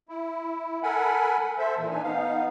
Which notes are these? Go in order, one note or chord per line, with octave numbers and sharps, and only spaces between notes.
E4
A4 A#4 F#5 G#5 B5
A4 C5 E5
A#2 E3 A#3
D4 D#4 G#5
B3 D#4 F5